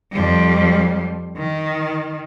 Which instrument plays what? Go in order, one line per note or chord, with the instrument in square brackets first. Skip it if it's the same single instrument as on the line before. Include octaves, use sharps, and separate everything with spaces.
[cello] F2 G3
D#3